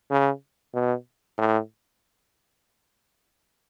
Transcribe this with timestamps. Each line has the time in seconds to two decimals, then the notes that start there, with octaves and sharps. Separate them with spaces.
0.11 C#3
0.74 B2
1.38 A2